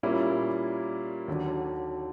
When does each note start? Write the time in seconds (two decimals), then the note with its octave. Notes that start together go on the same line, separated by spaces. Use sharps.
0.03 A#2 G3 A#3 C#4 E4
1.28 D#2 D3 F#3